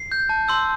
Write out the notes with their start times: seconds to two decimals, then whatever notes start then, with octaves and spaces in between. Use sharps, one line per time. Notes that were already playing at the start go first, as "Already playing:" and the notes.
Already playing: C7
0.12 G6
0.29 A5
0.48 C6 E6 G6